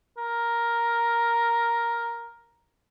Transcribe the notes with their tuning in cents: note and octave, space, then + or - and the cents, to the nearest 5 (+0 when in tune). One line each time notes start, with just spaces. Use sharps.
A#4 +5